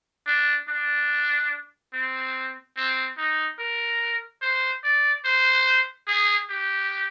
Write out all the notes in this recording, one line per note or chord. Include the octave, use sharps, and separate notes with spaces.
D4
D4
C4
C4
D#4
A#4
C5
D5
C5
G#4
G4